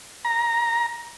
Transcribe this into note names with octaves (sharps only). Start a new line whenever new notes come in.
A#5